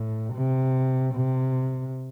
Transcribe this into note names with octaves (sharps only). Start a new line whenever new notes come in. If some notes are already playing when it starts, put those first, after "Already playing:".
Already playing: A2
C3
C3